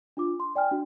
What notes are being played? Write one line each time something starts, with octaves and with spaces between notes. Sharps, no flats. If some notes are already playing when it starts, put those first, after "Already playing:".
D4 F4 D6
C6
D5 G5 G#5 F6
D4 F#4